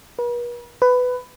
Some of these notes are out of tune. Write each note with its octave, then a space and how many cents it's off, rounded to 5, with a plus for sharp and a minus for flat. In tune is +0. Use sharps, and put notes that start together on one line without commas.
B4 -45
B4 +15